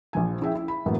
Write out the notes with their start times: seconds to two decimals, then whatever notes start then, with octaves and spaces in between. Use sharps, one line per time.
0.13 A#1 F3 G#5
0.41 C#4 E4 G#4 E5 G5
0.55 E4
0.68 B5
0.86 F#2 A2 E3 A#3 B3